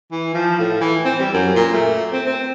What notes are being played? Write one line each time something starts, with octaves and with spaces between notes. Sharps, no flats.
E3
F3
A2
E3
C4
G3
F#2
A#2
A3
C4
C4